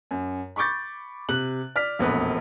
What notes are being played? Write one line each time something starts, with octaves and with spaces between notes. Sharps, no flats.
F#2
B5 C#6 D6 G6 A6
C3 F#6 F#7
D5 F6 B6
E1 A#1 F2 B3 B4